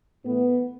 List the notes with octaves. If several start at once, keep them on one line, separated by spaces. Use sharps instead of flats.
A2 E3 A3 B3